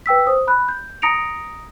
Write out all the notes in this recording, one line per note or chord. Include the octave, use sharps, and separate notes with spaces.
B4 G5 E6 B6
C5 D#6
B5 F#6
G6
A#5 D#6 A#6 C#7 D7 F7